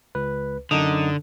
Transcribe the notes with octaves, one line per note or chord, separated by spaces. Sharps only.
C#2 B4
F#2 D3 D#4 D#6